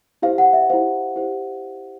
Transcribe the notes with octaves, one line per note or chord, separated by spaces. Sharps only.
E4 G4 C5 F5
F#5
E5
E4 G4 C5 F5
E4 G4 C5